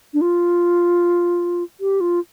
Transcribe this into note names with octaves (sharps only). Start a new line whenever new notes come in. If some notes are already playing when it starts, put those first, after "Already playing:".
D4
F4
G4
F4